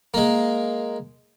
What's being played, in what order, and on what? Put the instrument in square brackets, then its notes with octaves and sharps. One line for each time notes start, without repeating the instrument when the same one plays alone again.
[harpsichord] G#3 A#3